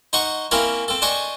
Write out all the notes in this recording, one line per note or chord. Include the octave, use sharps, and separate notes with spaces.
D#4 C5 D#5 F#5 C#6
A#3 C4 C#4 E4 A#4 C#5
C4 A4
D4 C5 D#5 G#5 C#6